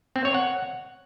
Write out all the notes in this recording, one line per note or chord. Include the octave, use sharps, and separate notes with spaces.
C4
C#5
F#5